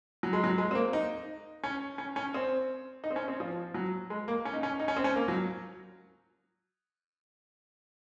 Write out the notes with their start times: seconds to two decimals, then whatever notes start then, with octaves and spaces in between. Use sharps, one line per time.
0.23 F#3
0.33 G#3
0.44 F#3
0.58 G#3
0.71 C4
0.75 A#3
0.93 D#4
1.64 C#4
1.98 C#4
2.16 C#4
2.34 C4
3.04 D#4
3.11 C4
3.16 C#4
3.28 C4
3.40 F3
3.74 F#3
4.10 G#3
4.28 A#3
4.45 C#4
4.53 D#4
4.63 C#4
4.80 D#4
4.88 C#4
4.97 C4
5.04 C#4
5.16 A#3
5.28 F#3